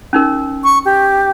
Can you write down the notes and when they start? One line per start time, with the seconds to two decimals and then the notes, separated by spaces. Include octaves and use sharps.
0.13 C#4 D#4 A#4
0.64 C#6
0.85 G4